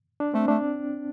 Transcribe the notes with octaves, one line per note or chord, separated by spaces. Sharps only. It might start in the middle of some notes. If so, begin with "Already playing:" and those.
D4
A3 C4
A3 D4